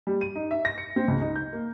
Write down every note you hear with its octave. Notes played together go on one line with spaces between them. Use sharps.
G3
D#7
D#4
E5
A#6
C#7
C4
C#2
D#4
G6
A#3